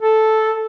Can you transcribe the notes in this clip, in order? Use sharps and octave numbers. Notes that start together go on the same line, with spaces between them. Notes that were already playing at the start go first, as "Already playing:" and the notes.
A4